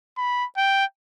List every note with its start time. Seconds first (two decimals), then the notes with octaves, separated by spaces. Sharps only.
0.17 B5
0.57 G5